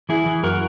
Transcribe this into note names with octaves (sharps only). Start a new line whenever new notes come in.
E3 E4 G#4
E3
F#2 F#4 A#4